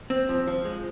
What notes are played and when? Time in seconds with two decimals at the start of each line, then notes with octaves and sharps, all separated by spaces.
0.10 C4
0.29 F3
0.47 F3
0.65 G#3